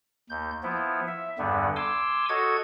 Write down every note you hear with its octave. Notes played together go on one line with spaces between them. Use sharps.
D#2 G6
F3 B3 E4
E5
E2 G2 D3 G3 B3
G#5 C6 D6 E6
F#4 A4 C#5 D#5 G#6